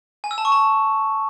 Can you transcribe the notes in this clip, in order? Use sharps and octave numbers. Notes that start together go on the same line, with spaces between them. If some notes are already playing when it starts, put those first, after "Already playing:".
G#5
E6
A5
C#6
A5